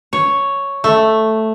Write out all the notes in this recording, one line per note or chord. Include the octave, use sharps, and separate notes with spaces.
C#5
A3